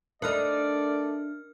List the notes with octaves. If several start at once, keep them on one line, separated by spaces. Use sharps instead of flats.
A3 D4 D#4 A#4 D5 F6